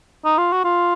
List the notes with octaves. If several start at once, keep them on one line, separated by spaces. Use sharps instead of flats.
D#4
F4
F#4
F4